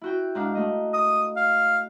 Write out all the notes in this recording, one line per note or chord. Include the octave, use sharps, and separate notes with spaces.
E4 F#4 G5
G#2 D4 F5
A3 D#5
D#6
F5